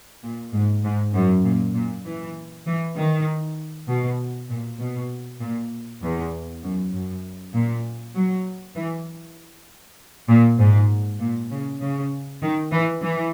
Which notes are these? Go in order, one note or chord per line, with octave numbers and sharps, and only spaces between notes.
A#2
G#2
G#2
F#2
A#2
A#2
E3
E3
D#3
B2
A#2
B2
A#2
E2
F#2
F#2
A#2
F#3
E3
A#2
G#2
A#2
C#3
C#3
D#3
E3
E3